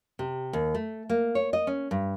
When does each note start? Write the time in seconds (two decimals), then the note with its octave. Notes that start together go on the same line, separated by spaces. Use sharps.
0.19 C3
0.53 D#2
0.75 A3
1.09 A#3
1.35 C#5
1.53 D#5
1.67 C#4
1.91 G2